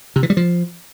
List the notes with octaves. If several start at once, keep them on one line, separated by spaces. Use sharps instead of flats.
C3
E3
G3
F3